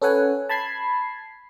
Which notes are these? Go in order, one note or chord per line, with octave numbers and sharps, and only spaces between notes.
C#4 A4 B4 F#5 G#5
A5 B5 G#6 C7